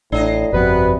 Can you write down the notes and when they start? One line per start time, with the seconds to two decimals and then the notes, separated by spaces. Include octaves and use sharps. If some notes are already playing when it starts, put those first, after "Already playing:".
0.12 A1 A2 D4 D#5
0.53 G1 F2 C3 F3 B3 F#4 B4